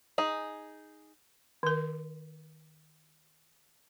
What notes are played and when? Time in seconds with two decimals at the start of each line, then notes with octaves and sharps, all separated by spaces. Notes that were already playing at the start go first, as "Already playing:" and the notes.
0.18 D#4 G#4
1.63 D#3 A#4